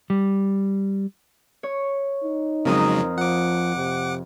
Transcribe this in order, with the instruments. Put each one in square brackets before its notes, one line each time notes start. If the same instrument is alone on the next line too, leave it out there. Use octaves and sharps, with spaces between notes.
[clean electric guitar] G3
[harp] C#5
[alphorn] D#4
[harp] F2 A#4 D#6 [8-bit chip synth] C#3 F#3 G#3
[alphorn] F3 [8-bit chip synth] F#5 D6
[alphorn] C3